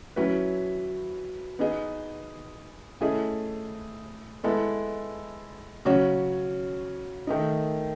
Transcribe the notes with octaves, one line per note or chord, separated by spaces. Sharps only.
F#3 C#4 E4 B4
B3 D#4 G#4 D#5
A3 C#4 E4 G#4 D#5
G#3 B3 E4 A4
C#3 F#3 C#4 F#4 C#5
D#3 A3 D#4